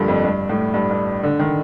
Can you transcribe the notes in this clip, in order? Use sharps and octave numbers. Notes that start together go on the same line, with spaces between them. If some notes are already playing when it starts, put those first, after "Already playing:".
Already playing: G2 D3 F3 G3 A3 A#3
F2
G2
A2
G2
G2
D3
D#3